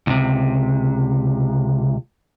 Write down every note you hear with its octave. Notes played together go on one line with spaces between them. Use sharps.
C#2 C3